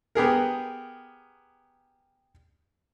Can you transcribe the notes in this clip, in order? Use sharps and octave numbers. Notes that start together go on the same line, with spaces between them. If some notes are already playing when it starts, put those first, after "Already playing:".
B3 G4 G#4 A#4